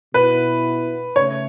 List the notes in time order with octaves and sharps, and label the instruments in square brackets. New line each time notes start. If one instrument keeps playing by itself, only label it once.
[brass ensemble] B2 B3 E4 [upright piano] B4
[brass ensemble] C#3 A3 [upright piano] C#5